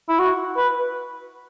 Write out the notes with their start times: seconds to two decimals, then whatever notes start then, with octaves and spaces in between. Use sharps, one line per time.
0.09 E4
0.19 F#4
0.57 B4